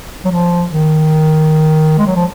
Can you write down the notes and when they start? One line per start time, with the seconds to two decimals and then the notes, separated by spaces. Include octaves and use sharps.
0.25 F#3
0.31 F3
0.71 D#3
1.98 G#3
2.07 F#3
2.15 F3